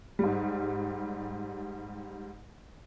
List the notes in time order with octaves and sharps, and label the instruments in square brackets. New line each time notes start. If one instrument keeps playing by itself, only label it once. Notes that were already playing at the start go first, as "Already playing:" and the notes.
[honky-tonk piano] G#2 G3